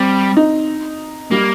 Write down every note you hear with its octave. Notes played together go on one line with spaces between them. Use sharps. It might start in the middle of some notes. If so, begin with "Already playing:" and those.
Already playing: G3 C4
D#4
G3 A#3